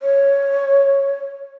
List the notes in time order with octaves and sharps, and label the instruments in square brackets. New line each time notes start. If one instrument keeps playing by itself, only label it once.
[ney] C#5